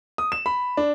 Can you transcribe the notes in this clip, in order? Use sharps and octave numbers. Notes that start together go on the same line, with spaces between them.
D#6
E7
B5
D4